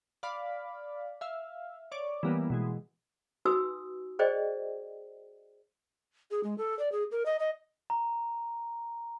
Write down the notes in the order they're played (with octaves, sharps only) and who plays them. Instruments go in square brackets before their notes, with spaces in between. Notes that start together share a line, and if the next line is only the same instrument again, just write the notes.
[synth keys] D5 F5 B5
E5 F5
C#5 D5 D6
E3 G3 A#3 B3
B2 E3 G#3
[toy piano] D#4 F#4 B4 G#5 D#6 E6
G#4 C5 D5 D#5 G5
[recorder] G#4
G#3
A4
D5
G#4
A#4
D#5
D#5
[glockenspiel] A#5